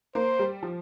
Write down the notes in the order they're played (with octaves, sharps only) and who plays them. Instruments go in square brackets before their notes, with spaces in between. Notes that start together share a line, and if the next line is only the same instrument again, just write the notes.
[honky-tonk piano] A#3 [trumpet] C5
[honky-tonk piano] G3
F3